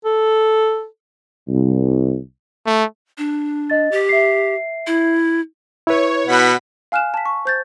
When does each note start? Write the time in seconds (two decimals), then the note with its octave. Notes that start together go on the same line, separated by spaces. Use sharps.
0.05 A4
1.48 C2
2.66 A3
3.18 D4
3.70 D#5 A6
3.91 G4
4.09 E5 C7
4.87 E4
5.87 E4 B4 C#5
6.27 B2 F#5 B5 B6
6.92 F5 G#5 F6 F#6 E7
7.14 A5 B6
7.26 C#6
7.45 C5 G6 A6